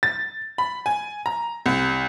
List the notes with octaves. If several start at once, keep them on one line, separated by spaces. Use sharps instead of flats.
A6
B5
G#5
A#5
C2